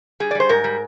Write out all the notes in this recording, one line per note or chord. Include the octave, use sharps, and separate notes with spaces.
G3 G#4
D5
G3 C5
G#2 A#4
G3